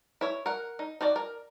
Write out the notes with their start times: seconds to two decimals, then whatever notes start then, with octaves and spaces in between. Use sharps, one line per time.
0.21 E4 C#5
0.46 A#4 F#5
0.79 D#4
1.01 D#4 F#4 D5
1.16 A#4